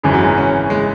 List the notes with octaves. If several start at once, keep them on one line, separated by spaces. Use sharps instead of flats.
G#1 F#2 C#3 E3 G#3
F#3
G#3
C#4
G#3